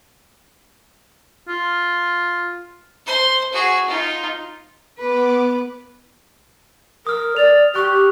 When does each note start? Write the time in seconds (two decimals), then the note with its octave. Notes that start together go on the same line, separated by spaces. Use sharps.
1.49 F4
3.06 C5 C6
3.53 F#4 G#4
3.88 D#4 F4
4.98 B3 B4 D6
7.07 A#4 D#6 F6
7.37 D5 F7
7.75 G4 C#6 F#6